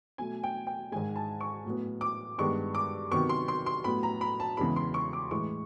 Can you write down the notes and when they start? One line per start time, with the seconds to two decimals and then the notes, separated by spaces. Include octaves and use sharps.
0.18 B2 F#3 A3 G#5
0.43 G5
0.67 G5
0.92 G#2 D#3 G#3 G#5
1.16 A5
1.41 C#6
1.65 A2 F#3 B3
2.01 D6
2.38 G2 D#3 G#3 B3 C#6
2.75 D6
3.11 C3 D#3 F#3 B3 C#6
3.29 C6
3.48 C6
3.66 C6
3.84 A2 F#3 B3 B5
4.03 A#5
4.21 B5
4.40 A5
4.57 E2 C#3 E3 G#3 B3 B5
4.76 C6
4.94 C#6
5.13 D6
5.31 A2 E3 G#3 C#6